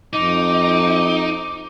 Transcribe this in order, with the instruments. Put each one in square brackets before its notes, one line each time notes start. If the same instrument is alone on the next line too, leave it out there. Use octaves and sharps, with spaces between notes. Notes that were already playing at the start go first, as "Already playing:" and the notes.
[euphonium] F2 [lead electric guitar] D#4 [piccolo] D6